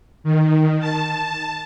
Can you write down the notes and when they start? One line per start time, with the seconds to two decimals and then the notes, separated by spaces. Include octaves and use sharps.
0.24 D#3
0.80 A5